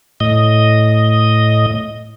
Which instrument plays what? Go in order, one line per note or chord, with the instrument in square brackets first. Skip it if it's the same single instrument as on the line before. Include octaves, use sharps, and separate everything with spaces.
[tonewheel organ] A2 D#5